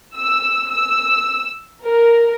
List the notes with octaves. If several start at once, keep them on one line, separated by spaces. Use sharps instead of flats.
E6
E6
A#4